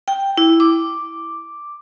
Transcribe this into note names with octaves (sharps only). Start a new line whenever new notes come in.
G5
E4
D6